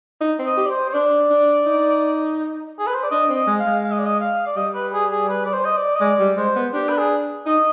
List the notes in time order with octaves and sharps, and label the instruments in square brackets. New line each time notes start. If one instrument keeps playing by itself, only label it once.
[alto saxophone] D#4
C4
[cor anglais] D#5
[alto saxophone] G4
[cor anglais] D5
C5
C5
[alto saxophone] D4 [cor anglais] D5
[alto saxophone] D4
D#4
[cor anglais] G#4
B4
C5
D5
[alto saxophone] D4 [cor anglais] D#5
[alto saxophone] C4
[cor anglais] D#5
[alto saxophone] G#3
[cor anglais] F5
[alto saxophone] G#3
[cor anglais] F5
D#5
D5
D#5
F5
D5
[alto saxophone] G3 [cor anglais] D#5
[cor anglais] B4
G#4
G#4
B4
D5
C5
D#5
D5
D#5
[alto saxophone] G#3 [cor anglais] D5
[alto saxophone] G3
[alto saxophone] G#3 [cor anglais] C5
[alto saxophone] B3
[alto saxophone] D4 [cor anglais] G4
[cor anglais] B4
G#4
[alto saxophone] D#4 [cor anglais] D#5